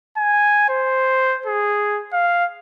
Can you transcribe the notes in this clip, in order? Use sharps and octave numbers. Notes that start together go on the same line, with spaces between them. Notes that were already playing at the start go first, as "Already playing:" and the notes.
G#5
C5
G#4
F5